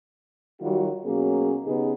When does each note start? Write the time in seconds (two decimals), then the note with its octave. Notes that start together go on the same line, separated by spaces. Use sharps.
0.60 D#3 F#3 G3 F4 F#4
1.05 B2 F#3 A#3 C#4 G#4
1.65 C#3 B3 D#4 G4 G#4